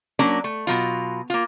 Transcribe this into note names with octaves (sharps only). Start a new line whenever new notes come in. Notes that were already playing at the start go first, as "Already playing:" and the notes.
F#3 A#3 C#4 D4
A3
B2 F#3 F4
A#3 F4